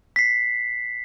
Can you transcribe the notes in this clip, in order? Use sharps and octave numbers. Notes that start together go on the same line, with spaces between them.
B6 C7